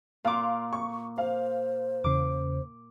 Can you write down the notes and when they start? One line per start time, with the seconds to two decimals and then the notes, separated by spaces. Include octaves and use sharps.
0.25 A#2 F5 C6 D6
0.73 C#6
1.18 C5 F5
2.04 E2 C#3 D6